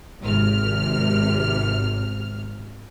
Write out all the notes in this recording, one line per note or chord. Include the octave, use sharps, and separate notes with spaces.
G#1 C3 F6